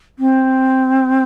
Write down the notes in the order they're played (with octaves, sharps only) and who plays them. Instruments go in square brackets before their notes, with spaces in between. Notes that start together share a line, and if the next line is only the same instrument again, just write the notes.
[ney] C4